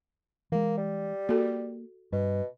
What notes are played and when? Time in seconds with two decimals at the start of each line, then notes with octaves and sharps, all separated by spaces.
0.52 E3 G#3 A#3
0.77 G3
1.29 A#3 F#4 A4
2.12 G2 B2